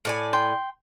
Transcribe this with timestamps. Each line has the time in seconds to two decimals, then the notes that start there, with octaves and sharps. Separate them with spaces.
0.05 A2 D5 G#5
0.33 G5 C6